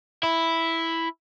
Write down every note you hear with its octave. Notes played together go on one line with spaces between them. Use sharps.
E4